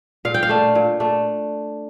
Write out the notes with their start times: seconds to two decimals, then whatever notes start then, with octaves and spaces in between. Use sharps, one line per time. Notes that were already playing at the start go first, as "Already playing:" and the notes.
0.25 A#2 F5
0.34 G5
0.43 F5
0.49 A3 D4
0.75 A#2
1.00 A3 D4